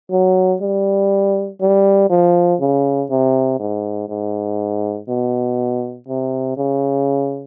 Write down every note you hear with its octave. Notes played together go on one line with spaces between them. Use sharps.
F#3
G3
G3
F3
C#3
C3
G#2
G#2
B2
C3
C#3